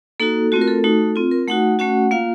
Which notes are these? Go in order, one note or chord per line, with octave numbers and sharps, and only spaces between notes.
A#3 D#4 F#4 A4
A3 C4 F4 F#4
A#4
A4
A3 D#4 F#4
C4 F4
A#4
A3 D#4 F#4 F#5
A3 C#4 F#4 F#5
A#3 F4 F5